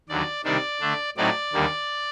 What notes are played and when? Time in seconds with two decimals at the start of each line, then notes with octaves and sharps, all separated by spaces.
0.09 D#2 D3 F#3 D5
0.44 C3 D#3 G3 D4 D5
0.81 D3 A3 D4
1.17 A2 F#3 C4 D#4 D5
1.53 D#2 D3 G3 A#3